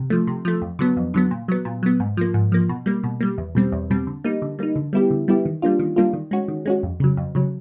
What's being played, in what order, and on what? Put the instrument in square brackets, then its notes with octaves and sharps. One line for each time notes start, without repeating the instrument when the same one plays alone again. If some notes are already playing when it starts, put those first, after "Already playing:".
Already playing: [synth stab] C3
F3 A3
C3
F3 A3
F2
D3 F#3 B3
F2
D3 F#3 B3
A#2
F#3 B3
A#2
F#3 B3
G#2
F3 A#3
G#2
F3 A#3
B2
G3 A#3
B2
G3 A#3
E2
B2 G3 C4
E2
B2 G3 C4
D3
G3 A#3 D#4
D3
G3 A#3 D#4
D3
G3 B3 E4 G4
D3
G3 B3 E4 G4
D#3
G3 A#3 D4 F4
D#3
G3 A#3 D4 F4
D#3
G#3 C#4 F#4
D#3
G#3 C#4 F#4
F2
C#3 F#3
F2
C#3 F#3